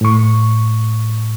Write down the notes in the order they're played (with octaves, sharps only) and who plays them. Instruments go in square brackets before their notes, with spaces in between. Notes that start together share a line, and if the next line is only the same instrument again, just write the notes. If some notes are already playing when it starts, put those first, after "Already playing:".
[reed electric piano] A2 C#6